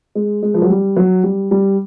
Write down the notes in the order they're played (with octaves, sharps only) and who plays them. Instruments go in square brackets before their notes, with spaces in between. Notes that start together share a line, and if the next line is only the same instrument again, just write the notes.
[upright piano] G#3
G#3
F3
F#3
G3
F#3
G3
G3